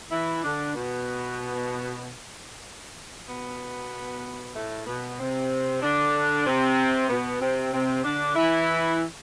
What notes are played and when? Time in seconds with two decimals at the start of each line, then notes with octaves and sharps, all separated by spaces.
0.11 E3 E4
0.44 D3 D4
0.75 B2 B3
3.29 B2 B3
4.55 A2 A3
4.87 B2 B3
5.19 C3 C4
5.82 D3 D4
6.46 C3 C4
7.09 B2 B3
7.41 C3 C4
7.73 C3 C4
8.04 D3 D4
8.36 E3 E4